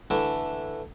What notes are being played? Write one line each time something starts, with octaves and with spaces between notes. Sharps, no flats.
D3 E3 A3 D4 E4